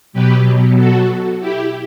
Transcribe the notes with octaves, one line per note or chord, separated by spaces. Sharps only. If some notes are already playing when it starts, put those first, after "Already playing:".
B2 F#3 G4 B4
F#4 A4
E4 G4